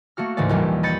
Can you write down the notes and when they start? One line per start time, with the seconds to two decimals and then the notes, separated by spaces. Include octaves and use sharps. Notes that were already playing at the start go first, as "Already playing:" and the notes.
0.17 A3 A#3 F#4 F6
0.37 D2 G#2 C#3 E3 A#4 D5
0.49 A#1 D#2 E3 G3
0.83 D#5 B5 G6 A6 C#7